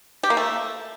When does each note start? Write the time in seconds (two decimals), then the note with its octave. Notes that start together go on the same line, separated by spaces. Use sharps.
0.23 G4
0.30 A#3
0.37 A3